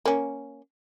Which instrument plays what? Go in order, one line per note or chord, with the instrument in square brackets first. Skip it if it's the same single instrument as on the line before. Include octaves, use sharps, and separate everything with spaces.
[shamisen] A#3 C#4